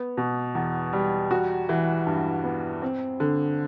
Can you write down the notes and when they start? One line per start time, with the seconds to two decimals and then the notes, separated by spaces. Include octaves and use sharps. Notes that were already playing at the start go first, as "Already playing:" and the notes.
Already playing: B3
0.17 B2
0.55 E2
0.93 G3
1.31 F#4
1.69 E3
2.07 G2
2.44 B3
2.82 C4
3.20 D3